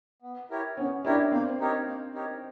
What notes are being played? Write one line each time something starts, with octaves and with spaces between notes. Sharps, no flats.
B3
E4 G4 A#4 C#5
B3 C#4
D4 E4 G4 A#4 C#5
A#3 C4
D#4 G4 A#4 C#5
A#3
D#4 G4 A#4 C#5